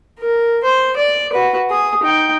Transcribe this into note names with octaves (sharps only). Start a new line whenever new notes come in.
A#4
C5
D5
F#4 B4
G#4 D#6
D#4 G5